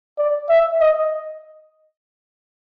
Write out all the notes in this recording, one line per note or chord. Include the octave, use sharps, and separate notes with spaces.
D5
E5
D#5